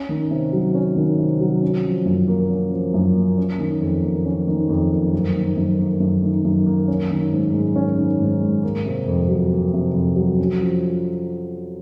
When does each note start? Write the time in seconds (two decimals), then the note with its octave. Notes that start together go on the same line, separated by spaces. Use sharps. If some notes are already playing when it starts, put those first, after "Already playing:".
Already playing: C#4
0.09 D#3
0.31 C3
0.52 F#3
0.74 C#4
0.96 D#3
1.19 C3
1.40 F#3
1.62 C#4
1.84 F3
2.05 F#2
2.28 A#3
2.50 C#4
2.71 F3
2.94 F#2
3.16 A#3
3.38 C#4
3.59 D#3
3.81 F2
4.03 A#3
4.25 C#4
4.47 D#3
4.69 F2
4.91 A#3
5.13 F#2
5.35 D#3
5.57 F#2
5.79 A#3
6.00 F#2
6.23 D#3
6.44 F#2
6.66 A#3
6.88 C#4
7.10 D#3
7.32 G#2
7.53 G#3
7.76 C#4
7.97 D#3
8.20 G#2
8.41 G#3
8.63 A#3
8.86 C3
9.08 F2
9.29 F#3
9.51 A#3
9.73 C3
9.95 F2
10.16 F#3
10.39 C#4
10.60 F3